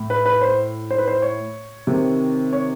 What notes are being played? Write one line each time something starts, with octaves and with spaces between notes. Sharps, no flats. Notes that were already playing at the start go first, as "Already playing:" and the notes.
Already playing: A2
B4
B4
C5
C5
B4
C5
C#5
C3 D#3
C#5